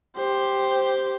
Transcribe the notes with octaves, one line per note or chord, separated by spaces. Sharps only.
G4 C5